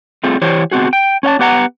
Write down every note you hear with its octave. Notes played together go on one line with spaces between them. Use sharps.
A3 C4 F4 G#4
E3 E4 G4 C5 C#5
B3 C4 F#4 G#4
G5
C#4 C#5 F#5 A5
B3 G4 B4 F#5 G#5 A#5